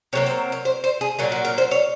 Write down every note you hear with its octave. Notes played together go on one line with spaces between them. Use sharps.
C3 F#3 A#3 C#5
C5
C#5
C5
C5
G#4
A#2 F#3 A#3
F#4
A#4
C5
C#5